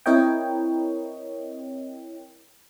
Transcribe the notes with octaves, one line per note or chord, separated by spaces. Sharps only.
C4 E4 A#4 C#5 D#5 G5